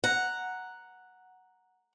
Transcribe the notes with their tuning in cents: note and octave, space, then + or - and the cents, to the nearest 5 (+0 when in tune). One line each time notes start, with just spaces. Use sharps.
F#5 +0 A#5 +0